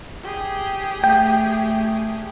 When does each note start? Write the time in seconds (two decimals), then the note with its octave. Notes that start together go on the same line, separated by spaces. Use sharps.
0.23 G4 G#4
1.04 A3 G5